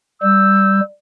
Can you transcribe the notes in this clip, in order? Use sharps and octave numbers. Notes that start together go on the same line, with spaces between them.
G3 E6 G6